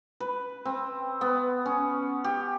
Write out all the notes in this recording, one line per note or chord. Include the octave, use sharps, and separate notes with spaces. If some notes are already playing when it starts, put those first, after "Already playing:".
B4
C4
B3
C#4
G4